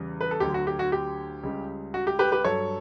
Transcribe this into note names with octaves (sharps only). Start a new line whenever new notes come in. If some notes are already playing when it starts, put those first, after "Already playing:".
Already playing: E2 C#3 G3
B4
A4
D2 D3 F#3 G4
F#4
G4
F#4
G4
C#2 C#3 G3
F#4
G4
G4 B4
G4 B4
G2 F#3 A4 C#5